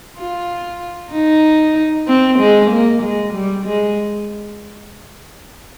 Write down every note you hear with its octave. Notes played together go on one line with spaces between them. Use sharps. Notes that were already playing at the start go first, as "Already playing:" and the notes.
F4
D#4
C4
G#3
A#3
G#3
G3
G#3